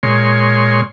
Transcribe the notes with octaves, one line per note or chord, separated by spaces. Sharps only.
A#2 G#3 C#5 C6